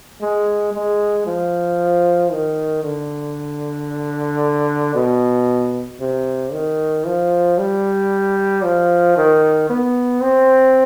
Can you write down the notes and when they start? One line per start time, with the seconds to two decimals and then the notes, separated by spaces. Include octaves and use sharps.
0.22 G#3
0.74 G#3
1.27 F3
2.32 D#3
2.84 D3
4.95 B2
6.00 C3
6.53 D#3
7.06 F3
7.58 G3
8.63 F3
9.17 D#3
9.70 B3
10.22 C4